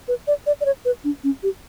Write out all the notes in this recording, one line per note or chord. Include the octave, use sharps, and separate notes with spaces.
B4
D5
D5
D5
C#5
B4
D4
C#4
G4